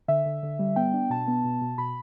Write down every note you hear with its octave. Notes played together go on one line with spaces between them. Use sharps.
D3 E5
D3
D3
G3
B3 G5
D4
B2 A5
B3
B2
B2
B2 B5